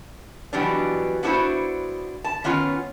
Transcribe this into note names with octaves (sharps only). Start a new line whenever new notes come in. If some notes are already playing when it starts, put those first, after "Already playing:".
B2 E3 F#3 G3 B3 D4
B3 D4 E4 F#4 C5
A5
D#3 B3 C#4 F4